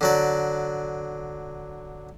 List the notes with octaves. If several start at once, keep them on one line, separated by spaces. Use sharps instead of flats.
D3 F#3 D5